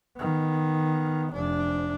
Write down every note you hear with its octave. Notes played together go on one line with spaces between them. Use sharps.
D#3 B3
F1 D4